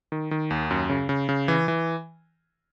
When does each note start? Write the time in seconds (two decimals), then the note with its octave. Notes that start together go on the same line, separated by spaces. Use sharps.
0.12 D#3
0.31 D#3
0.50 D#2
0.71 F#2
0.90 C#3
1.09 C#3
1.29 C#3
1.48 E3
1.68 E3